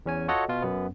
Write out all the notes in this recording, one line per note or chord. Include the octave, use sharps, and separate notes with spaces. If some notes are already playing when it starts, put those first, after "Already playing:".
E2 C#4 G#5
F4 F#4 A4 C#5 D#5 F#5
B2 F4
F#2 B3